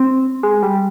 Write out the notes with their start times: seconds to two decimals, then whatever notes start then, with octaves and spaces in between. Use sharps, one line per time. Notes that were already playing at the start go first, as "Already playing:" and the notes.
Already playing: C4
0.43 G#3
0.63 G3